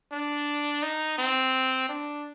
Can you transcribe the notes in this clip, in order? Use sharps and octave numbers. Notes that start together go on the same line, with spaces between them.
D4
D#4
C4
D4